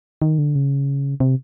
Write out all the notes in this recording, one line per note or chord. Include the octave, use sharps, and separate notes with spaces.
D#3
D3
C#3
C3